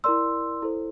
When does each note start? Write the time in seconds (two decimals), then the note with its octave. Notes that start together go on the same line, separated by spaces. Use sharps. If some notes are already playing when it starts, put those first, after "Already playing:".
0.04 E4 A#4 D5 C6 E6
0.62 E4 A4 C5